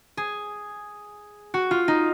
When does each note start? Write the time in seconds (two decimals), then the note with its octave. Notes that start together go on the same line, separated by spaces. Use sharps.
0.17 G#4
1.54 F#4
1.71 F4
1.88 D#4